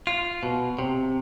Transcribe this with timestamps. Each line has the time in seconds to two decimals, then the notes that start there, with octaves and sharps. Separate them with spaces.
0.07 F4
0.43 B2
0.79 C3